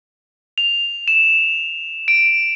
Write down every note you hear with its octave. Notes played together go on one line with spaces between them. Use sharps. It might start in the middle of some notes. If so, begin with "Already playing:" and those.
F7
E7
D7